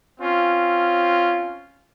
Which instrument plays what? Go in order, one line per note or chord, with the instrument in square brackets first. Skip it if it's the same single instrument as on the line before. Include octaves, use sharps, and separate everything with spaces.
[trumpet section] C4 C#4 F4